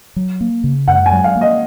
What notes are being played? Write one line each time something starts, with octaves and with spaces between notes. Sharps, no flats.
F#3
A#3
C#3
F#2 F#5
G#5
F#3
F5
A#3
D#5